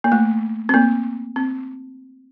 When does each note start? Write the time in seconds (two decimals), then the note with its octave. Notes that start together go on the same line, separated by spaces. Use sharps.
0.04 A#3
0.12 A3
0.69 C4
0.74 A#3
1.36 C4